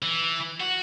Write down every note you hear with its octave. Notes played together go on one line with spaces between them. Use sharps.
E3
F#4